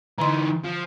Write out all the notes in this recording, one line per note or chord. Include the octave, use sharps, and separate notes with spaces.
D3 E3 D#4 C6
F3